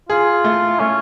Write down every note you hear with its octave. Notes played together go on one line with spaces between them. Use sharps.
F4 G#4
A3
A3 C#4